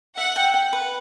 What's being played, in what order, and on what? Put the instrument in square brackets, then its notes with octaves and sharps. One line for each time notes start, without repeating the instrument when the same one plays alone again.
[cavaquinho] E5 [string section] F#5
[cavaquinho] G5
G5
B4